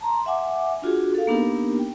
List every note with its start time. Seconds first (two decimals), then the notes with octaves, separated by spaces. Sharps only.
0.01 A5 A#5 C6
0.26 E5 F#5 G#5 D6
0.82 D4 F4 F#4 G#4
1.15 A4 F5
1.27 A#3 B3 D4 D#4 G4 A#4
1.79 G5